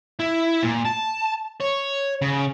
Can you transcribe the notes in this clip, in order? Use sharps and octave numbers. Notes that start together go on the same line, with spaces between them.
E4
A#2
A5
C#5
C#3